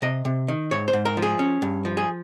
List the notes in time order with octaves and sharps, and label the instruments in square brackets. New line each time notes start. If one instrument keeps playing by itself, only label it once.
[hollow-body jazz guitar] C3 D#5
C3
D#3
G#2 C#5
C5
G#2
A#4
F3
G#4
C#4
G2
F3
G#4